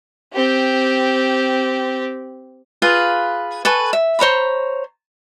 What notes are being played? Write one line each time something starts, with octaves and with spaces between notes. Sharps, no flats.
C4 G4
F4 G#4 B4 F5
A4 B4 G#5 C#6
E5
C5 C#5 A#5 B5